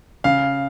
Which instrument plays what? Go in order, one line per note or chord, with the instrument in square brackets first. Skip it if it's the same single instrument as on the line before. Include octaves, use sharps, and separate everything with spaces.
[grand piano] C#3 F5